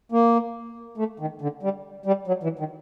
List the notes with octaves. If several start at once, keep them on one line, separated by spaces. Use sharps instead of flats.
A#3
A3
D#3
D3
G3
G3
F#3
E3
D#3